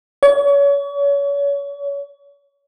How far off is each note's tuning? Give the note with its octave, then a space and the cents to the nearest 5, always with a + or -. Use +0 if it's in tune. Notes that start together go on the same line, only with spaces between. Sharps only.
C#5 +35